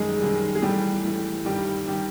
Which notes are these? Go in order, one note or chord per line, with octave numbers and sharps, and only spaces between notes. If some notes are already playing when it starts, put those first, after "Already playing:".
Already playing: F#2 D#3 G3 G#3 G#4
F#2 D#3 G3
G#4
A2 E3 G3 A3 G4
A2 E3 A3
G2 D#3 G3 G4
D#3 G3 G4